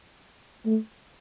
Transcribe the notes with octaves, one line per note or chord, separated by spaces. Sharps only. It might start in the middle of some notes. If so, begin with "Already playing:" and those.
A3